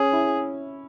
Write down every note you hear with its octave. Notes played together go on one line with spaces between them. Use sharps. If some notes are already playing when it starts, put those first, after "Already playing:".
Already playing: C#4 G#4
E4